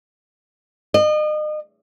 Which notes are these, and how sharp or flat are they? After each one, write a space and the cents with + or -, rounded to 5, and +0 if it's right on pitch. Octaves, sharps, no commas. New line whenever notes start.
D#5 -35